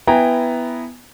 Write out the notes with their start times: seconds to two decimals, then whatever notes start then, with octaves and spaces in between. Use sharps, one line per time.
0.07 B3 E4 G5 G#5 A#5